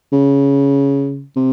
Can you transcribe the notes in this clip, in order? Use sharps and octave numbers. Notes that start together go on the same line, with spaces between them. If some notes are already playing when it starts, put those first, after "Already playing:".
C#3
C3